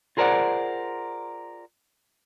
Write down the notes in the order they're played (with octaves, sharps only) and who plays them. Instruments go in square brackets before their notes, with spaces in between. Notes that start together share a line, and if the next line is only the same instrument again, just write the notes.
[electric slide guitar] F4 G#4 A#4 C5 D5 F#5